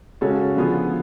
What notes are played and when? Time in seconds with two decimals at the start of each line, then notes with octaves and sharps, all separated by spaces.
0.21 C#3 G#3 C#4 F#4 A4
0.55 D3 F3 B3 F4 G#4